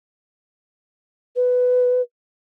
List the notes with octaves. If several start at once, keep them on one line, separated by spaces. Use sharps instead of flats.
B4